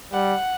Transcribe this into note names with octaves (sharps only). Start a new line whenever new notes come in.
G3 F#5